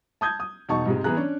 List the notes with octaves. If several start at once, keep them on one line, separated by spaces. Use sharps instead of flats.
A5 D#6 G6 G#6
D#6
E1 D#4 A5 C#6
G#2 C3 G#3
E3 B3 G#4 A#5 F#6
C#4 D4 C#5